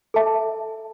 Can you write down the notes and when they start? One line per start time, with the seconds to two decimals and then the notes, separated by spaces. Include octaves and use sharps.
0.14 A4 E5 A5